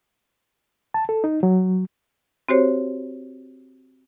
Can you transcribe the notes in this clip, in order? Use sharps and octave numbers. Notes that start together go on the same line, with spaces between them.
A5
A4
D#4
F#3
C4 F#4 G4 C5 C#5